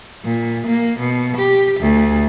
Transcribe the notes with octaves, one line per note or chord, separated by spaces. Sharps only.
A#2
A#3
B2
G4
D2